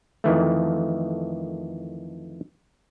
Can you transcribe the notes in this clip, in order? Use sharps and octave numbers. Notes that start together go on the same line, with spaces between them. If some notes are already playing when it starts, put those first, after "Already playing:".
F2 D#3 E3 A3